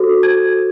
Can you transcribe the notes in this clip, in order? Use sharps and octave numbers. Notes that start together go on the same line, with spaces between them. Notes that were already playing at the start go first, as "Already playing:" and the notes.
Already playing: F#4 A4 C5
G#6